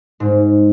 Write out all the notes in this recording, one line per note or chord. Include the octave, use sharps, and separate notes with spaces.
G#2